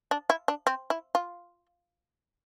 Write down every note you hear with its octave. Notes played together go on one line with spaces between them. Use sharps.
D4
E4
D4
C4
E4
F4